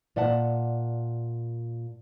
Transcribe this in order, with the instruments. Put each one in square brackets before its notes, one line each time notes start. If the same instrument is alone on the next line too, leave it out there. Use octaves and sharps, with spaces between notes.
[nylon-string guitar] A#2 D5 E5 F#5 A5